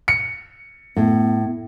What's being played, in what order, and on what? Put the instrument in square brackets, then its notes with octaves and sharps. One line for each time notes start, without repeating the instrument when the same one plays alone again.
[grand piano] C#7
[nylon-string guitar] A2 [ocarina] B3